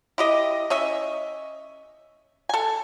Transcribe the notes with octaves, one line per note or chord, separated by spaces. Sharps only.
E4 G4 D#5
C#4 D#5 E5
A4 G#5